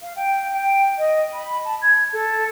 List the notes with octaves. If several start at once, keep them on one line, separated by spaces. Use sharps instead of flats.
F5
G5
G5
D#5
B5
A5
G#6
A4